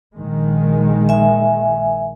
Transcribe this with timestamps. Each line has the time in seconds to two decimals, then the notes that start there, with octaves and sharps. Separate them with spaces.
0.15 A#1 D#3 G#3
1.09 E5 G#5